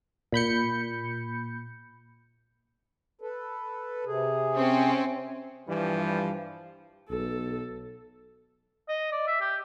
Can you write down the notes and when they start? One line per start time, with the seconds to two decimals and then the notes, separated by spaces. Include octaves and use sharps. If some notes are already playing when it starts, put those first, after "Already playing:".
0.32 A#2 B5 G6 C#7
3.21 A4 B4
4.05 C3 G#4
4.54 C4 C#4
5.68 G2 E3 F3 G3
7.10 B1 A4
8.89 D#5
9.12 D5
9.27 E5
9.41 G4